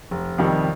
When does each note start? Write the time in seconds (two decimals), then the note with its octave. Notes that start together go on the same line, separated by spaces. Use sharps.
0.11 F1
0.38 F2 C3 D#3 G3